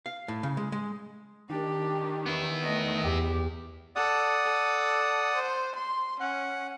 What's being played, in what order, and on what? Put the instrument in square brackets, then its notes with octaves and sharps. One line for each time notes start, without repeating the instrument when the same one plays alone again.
[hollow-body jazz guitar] F5
A2
C#3
G#3
G#3
[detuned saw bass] D#3 [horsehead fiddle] D4 G4
[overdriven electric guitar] B3 E4
[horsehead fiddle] A3 D#5
[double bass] E2 [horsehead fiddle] G4
[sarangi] A4 [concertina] D5 F#5 D#6
[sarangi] A4
C5
C6
[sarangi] C#4 [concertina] F#5